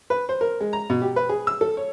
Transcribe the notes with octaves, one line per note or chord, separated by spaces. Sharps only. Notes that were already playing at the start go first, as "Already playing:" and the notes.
B4
C5
A#4
G#3
A#5
B2
G4
B4
G#4
E6
A4
C#5